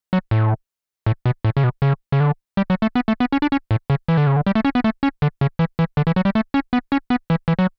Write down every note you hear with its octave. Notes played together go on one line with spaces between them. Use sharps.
F#3
A2
A2
B2
A2
C#3
B2
C#3
C#3
D3
G3
F#3
A3
B3
A3
B3
C#4
D4
C#4
A2
C#3
E3
D3
C#3
D3
G3
A3
C#4
B3
A3
C#4
D3
C#3
E3
E3
D3
E3
F#3
G3
A3
C#4
B3
C#4
B3
E3
E3
F#3